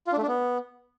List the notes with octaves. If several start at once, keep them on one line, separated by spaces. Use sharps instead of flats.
F4
D4
A3
D4
B3